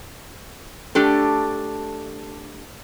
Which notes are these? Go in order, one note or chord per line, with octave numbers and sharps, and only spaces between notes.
A3 D4 G4 A4